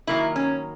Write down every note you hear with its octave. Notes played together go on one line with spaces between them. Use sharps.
D#3 F#3 A#3 E4
C#4